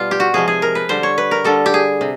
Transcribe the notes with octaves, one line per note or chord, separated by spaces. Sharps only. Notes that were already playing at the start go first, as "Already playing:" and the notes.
Already playing: B2 G3 F4
G4
F#4
C3 F3 G#3 G#4
G#4
A#4
B4
D3 G3 C5
C#5
B4
A#4
D3 G3 A4
G4
G#4
C3